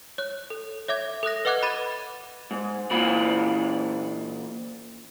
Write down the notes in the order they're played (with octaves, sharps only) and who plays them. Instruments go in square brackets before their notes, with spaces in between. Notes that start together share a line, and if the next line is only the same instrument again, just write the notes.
[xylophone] C#5 F#6
A4
C#5 E5 D6 G#6
A4 D#6 F#6 A#6
B4 D#5 F#5 D6 F#6 G#6
B5 D6 G#6 A6 D#7
[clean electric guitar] G#2
A#2 E3 F4 B5